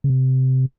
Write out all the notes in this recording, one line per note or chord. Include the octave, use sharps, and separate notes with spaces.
C#3
C3